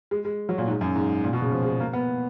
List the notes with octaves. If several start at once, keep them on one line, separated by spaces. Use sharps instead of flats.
G#3
G#3
F#3
A#2
G#2
F#2
G#2
A#2
B2
C#3
F3
G#3
A#3
B3